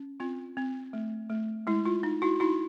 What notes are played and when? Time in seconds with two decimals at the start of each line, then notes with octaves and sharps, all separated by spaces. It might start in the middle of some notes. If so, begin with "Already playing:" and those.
Already playing: C#4
0.20 C4 F4
0.57 C4
0.93 A3
1.29 A3
1.67 G#3 E4
1.85 F4
2.03 D#4
2.22 E4 F#4
2.40 D#4 E4 F#4